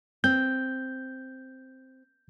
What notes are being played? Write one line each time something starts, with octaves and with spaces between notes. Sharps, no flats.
C4 G6